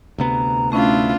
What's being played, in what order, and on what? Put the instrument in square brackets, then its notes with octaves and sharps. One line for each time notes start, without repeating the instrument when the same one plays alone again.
[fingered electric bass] D2 C3 B3 [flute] A#5
[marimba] A3 C#4 [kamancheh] D4 F4 [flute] E4